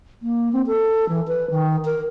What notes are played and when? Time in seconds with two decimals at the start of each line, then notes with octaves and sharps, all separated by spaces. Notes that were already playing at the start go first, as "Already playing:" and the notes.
0.22 A#3
0.52 C4
0.67 A4
1.09 E3
1.28 B4
1.50 D#3
1.85 A#4